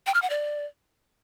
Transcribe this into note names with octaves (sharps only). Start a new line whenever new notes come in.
G5
F6
F#5
D5